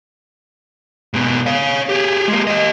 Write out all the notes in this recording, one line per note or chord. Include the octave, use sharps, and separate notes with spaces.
G#2 B2
C#5 F5
G4 G#4
G#3 A#3
G4 D#5